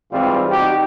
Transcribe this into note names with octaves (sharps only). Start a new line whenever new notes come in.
G#2 E3 G3 C4 F4
D#4 F#4 G4